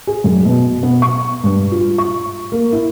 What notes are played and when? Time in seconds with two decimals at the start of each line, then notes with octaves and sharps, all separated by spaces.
0.07 G#4
0.24 F#2
0.45 B2
0.83 B3
1.02 C#6
1.44 G2
1.72 F4
1.98 C#6
2.52 A#3
2.73 E4